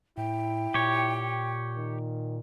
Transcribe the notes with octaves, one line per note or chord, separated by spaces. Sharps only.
A2 E4 G5
A#2 G4 C#5
D#3